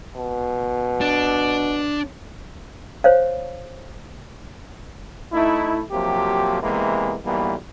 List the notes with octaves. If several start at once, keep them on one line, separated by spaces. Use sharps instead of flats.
B2
D4
C5 C#5 F5
A3 D#4 E4
C3 F3 F#3 A#3 G4
C3 E3 G#3 A#3 B3
B1 E3 G3 A#3 B3